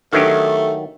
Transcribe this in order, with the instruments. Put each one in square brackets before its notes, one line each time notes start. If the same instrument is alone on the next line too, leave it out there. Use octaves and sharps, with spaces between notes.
[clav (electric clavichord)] D#3 F#3 G4 [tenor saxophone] A3 [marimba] D4 B4 F6